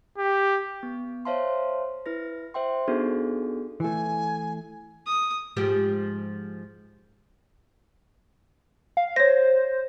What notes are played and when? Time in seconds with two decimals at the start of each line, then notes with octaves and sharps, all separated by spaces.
0.18 G4
0.83 B3
1.25 C5 C#5 E5 F5 A5 C6
2.06 E4 B4 A#6
2.54 C5 E5 G5 C6
2.88 B3 D4 D#4 F#4 G#4 A4
3.80 E3 A3 G#5
5.06 D#6
5.56 G#2 F3 G4
8.97 F5
9.16 C5 C#5 A#6